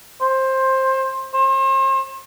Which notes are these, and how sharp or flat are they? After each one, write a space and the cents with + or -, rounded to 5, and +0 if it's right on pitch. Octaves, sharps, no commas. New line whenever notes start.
C5 +15
C5 +40